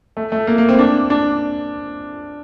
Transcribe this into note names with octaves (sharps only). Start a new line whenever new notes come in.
A3
A3
A#3
A#3
C4
D4
D4